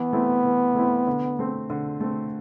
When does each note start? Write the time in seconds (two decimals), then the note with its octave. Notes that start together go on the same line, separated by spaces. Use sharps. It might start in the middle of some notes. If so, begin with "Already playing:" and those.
Already playing: E3 B3
0.13 A3 C4 E4
0.45 E3
0.75 A3 C4 E4
1.07 D3
1.39 A3 C4
1.70 D3
2.00 A3 C4